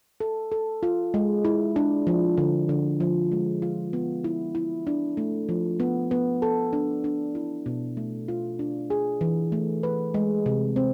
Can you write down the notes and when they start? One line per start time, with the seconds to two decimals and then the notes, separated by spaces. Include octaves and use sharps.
0.20 A4
0.52 A4
0.83 F4
1.14 G#3
1.45 E4
1.76 D4
2.07 F3
2.38 D3
2.69 D3
3.00 F3
3.32 G#3
3.62 F4
3.93 B3
4.24 E4
4.55 E4
4.87 D4
5.17 A3
5.49 F3
5.80 B3
6.11 B3
6.42 A4
6.73 D4
7.04 D4
7.35 E4
7.66 B2
7.97 A3
8.28 F4
8.59 D4
8.90 G#4
9.21 E3
9.52 A3
9.83 B4
10.14 G#3
10.46 C3
10.76 C4